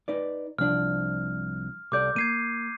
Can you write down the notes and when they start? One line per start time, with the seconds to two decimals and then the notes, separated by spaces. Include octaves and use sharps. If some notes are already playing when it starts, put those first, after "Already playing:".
0.08 D#4 B4 D5
0.59 C2 F3 D4 F6
1.92 C2 A4 D5 D6 G6
2.16 A#3 G#6 C7 D#7